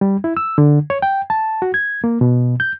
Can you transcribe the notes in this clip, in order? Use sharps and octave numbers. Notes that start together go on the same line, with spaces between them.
G3
E4
E6
D3
C#5
G5
A5
F#4
G#6
A#3
B2
G6